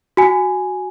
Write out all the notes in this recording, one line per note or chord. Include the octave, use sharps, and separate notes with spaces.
F#4 G#5